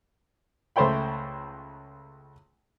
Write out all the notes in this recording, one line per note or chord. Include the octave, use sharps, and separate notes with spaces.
C#2 A3 C5 C#5 G5 B5